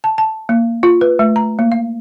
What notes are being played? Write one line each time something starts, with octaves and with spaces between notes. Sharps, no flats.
A5
A5
A#3
F4
B4
A3
A#5
A#3
F5